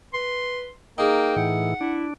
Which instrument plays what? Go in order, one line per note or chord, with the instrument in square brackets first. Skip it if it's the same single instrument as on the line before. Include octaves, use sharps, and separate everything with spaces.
[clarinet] B4 [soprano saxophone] C6
[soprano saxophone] A#3 [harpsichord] D#4 G#4 [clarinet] G5
[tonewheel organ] A2 E3 [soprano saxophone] F#5
[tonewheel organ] D4 [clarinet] E4